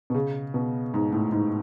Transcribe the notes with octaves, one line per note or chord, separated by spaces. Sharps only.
B2
C#3
B2
G#2
A2
G#2